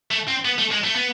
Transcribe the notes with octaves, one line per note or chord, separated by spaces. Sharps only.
A3
C4
B3
A3
G#3
A3
B3